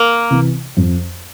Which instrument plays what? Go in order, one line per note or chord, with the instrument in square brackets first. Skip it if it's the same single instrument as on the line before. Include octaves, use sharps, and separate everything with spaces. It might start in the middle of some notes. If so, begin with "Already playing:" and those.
Already playing: [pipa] A#3
[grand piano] C3 E3
F2